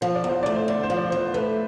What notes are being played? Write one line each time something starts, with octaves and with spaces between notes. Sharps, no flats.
F3 C5
D5
E2 C5
A3 D5
C5
D3 D5
C5
F3
D5
E2 C5
A3 B4